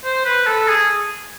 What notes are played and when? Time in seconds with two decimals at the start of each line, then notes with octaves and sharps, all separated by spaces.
0.04 C5
0.25 B4
0.47 A4
0.68 G#4